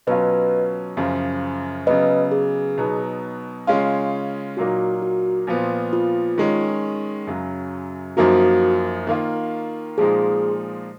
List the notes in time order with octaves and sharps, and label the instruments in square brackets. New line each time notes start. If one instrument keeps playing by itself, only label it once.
[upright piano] B2 F#3 C#4 F4 [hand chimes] B4 D#5
[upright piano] F#2 C#3 F3
[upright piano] C#3 F#3 B3 [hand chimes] B4 D#5
[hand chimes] G#4
[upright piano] B2 F#3 B3 D#4
C#3 G#3 C#4 F4
[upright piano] A#2 F#3 A#3 D#4 [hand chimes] F#4
[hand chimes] F#4
[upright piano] A#2 F3 B3
[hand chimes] F4
[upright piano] D#3 G#3 C#4
F#2 C#3 F#3
[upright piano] F#2 F3 A#3 D#4 [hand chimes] F#4
[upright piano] D#3 A#3 F4
[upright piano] A#2 F3 G#3 D#4 [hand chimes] G#4